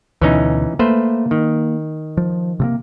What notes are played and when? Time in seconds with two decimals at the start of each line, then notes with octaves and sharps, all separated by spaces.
0.22 D2 B2 E3 C#4 D#4
0.79 A3 A#3 B4 C5
1.31 D#3
2.17 F3
2.60 C3 A3 A#3